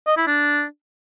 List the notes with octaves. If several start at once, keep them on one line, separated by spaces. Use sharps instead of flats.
D#5
E4
D4